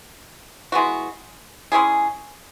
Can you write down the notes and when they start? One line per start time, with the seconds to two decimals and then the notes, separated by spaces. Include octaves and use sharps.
0.72 E3 G#3 B3 F#4
1.72 G#3 C#4 E4 G#4